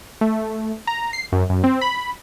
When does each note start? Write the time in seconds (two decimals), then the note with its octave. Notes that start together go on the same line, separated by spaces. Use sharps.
0.21 A3
0.87 A#5
1.13 C7
1.32 F#2
1.50 F#2
1.64 C4
1.81 B5